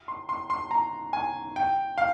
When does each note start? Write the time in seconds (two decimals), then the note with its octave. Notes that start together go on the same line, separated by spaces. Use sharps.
0.08 C6
0.29 C6
0.50 C6
0.71 A#5
1.13 G#5
1.56 G5
1.98 F5